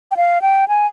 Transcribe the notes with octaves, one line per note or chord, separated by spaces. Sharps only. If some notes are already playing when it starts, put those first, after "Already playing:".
G5
F5
G5
G#5